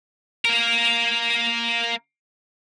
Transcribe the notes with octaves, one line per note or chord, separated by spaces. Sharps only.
A#3 A#4